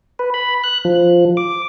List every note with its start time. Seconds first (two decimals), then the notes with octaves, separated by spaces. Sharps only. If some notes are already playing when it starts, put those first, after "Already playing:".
0.19 B4
0.34 B5
0.64 F#6
0.85 F3
1.37 D6